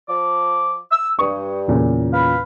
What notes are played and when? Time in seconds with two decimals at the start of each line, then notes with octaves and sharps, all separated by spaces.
0.08 F3 D6
0.91 E6
1.19 G2 C#6 D#6
1.68 E2 A#2 C#3
2.12 B4 F5 B5